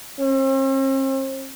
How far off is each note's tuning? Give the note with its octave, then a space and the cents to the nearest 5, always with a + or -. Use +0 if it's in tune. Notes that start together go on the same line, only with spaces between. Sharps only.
C4 +45